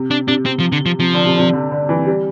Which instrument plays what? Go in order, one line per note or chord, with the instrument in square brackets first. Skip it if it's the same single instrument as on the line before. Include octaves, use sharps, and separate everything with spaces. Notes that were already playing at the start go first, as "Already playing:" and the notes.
Already playing: [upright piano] C3
[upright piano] C3 [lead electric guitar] D4
[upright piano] C3 [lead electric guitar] D4
[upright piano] C3 [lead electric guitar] C4
[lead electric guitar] F3
D3
F3
[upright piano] C3 [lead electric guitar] F3
[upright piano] D3
C3
D3
C3
D3
D3
E3
G3